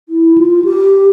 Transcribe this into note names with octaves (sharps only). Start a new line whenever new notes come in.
E4
F4
G4